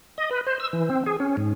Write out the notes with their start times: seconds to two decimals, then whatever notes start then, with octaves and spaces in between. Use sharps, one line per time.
0.18 D#5
0.31 B4
0.47 C5
0.60 E6
0.73 E3
0.90 C4
1.06 G#4
1.20 C#4
1.37 G#2